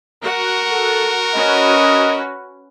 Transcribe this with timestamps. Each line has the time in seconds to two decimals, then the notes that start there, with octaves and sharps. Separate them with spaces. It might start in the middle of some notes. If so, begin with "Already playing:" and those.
0.23 F#4 A#4 F#5
0.72 A4
1.35 C#4 F#4 B4 D#5